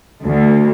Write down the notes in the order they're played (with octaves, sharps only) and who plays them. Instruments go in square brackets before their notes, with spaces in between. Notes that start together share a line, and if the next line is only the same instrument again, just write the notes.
[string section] D2